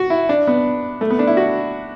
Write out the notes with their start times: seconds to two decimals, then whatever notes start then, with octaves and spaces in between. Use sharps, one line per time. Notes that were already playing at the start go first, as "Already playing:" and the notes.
Already playing: F#4
0.10 E4
0.29 D4
0.47 B3
1.01 A3
1.10 B3
1.19 D4
1.27 E4
1.37 F#4